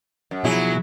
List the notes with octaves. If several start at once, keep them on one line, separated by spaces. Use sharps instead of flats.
F#2
B2 F3 F#3 E4 G#4